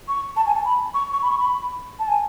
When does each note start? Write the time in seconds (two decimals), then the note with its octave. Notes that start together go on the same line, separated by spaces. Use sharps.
0.08 C#6
0.36 A5
0.46 G#5
0.56 A5
0.65 B5
0.94 C#6
1.13 C#6
1.22 B5
1.30 C#6
1.39 B5
1.99 A5
2.08 G#5